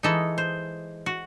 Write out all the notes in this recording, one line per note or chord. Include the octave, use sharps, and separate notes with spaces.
E3 G#3 D#4 A4
C5
F#4